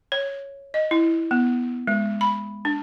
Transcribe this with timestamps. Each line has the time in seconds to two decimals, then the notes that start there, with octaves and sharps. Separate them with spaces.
0.12 C#5
0.74 D#5
0.91 E4
1.31 B3
1.87 G#3
2.21 B5
2.65 D4